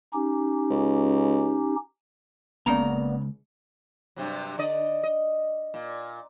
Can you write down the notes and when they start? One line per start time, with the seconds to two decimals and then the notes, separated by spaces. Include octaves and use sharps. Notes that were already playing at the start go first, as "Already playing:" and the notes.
0.13 C#4 D#4 G4
0.70 C#2
2.66 G1 C#2 C#3 A#3 B3 D5 A#5
4.16 G2 C3 F#3
4.58 D3 D5 D#5
5.04 D#5
5.74 A#2